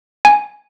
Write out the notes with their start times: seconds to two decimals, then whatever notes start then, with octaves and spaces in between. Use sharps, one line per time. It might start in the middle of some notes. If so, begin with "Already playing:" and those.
0.25 G#5